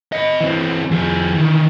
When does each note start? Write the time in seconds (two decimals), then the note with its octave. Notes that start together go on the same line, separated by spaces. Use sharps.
0.13 D#5 B5
0.41 E3 C4
0.92 F2 G#4
1.33 D#3 E3